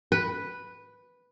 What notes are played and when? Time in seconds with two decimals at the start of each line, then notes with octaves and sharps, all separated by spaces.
0.12 B4